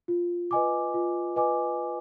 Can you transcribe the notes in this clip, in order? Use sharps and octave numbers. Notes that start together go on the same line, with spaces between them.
F4
B4 D#5 G#5 D6
F4
B4 D#5 G#5 D6